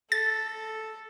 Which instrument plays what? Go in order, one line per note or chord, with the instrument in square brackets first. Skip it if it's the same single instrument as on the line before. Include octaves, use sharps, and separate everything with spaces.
[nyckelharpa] A4 [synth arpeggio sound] A6